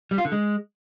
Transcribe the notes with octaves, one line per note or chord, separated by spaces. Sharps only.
G3
F4
D3
G#3